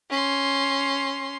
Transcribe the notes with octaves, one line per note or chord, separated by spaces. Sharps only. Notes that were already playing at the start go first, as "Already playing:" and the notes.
C#4 C6